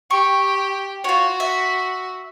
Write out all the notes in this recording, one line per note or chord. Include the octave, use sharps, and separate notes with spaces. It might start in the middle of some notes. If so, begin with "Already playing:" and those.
G4 C#6
F4 F#4 C#5
E5